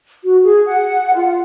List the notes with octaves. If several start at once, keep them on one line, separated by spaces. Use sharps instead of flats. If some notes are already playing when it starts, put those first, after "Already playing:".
F#4
G#4
F#5
F4